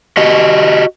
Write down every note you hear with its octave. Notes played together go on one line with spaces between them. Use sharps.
F#4 G4 D#5